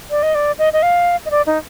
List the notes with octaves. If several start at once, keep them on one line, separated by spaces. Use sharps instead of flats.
D5
D#5
D5
D#5
D#5
F5
D#5
D5
D#4